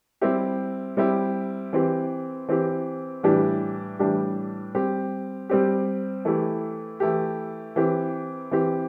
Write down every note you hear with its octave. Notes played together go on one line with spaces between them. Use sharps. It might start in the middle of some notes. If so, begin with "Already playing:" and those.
G3 C4 E4 G4
G3 C4 E4 G4
E3 C4 G4
E3 C4 G4
A2 E3 G3 D4 G4
A2 E3 G3 D4 G4
G3 C4 G4
G3 C4 G4
E3 A3 E4 G4
E3 A3 E4 G4
E3 C4 G4
E3 C4 G4